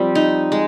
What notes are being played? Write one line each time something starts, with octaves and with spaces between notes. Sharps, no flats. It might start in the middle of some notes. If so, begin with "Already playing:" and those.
Already playing: F3 G3 C4
D#4
G#3